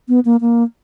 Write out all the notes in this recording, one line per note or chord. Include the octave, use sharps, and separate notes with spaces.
B3
A#3
A#3